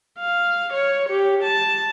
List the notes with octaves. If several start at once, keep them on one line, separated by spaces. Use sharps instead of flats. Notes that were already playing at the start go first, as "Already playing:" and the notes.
F5
C#5
G4
A5